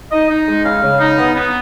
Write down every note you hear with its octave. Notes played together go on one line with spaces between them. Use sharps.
D#4 D#5
D#4
G#3
C#3 F5
C#3
D#4
B3
B3